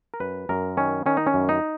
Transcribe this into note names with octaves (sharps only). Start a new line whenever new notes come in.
A#4
F#2 B4
F#2 A#4
D#3 C#4
D#3 C#4
D#4
C#4
F#2
D#4